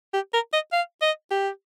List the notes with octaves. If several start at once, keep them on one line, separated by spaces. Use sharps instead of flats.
G4
A#4
D#5
F5
D#5
G4